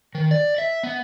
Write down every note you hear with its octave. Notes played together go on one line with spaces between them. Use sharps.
D#3
D5
E5
B3